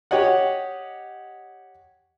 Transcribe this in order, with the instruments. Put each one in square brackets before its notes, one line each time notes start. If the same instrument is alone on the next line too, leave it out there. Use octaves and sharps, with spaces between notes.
[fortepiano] G4 C#5 D#5 F#5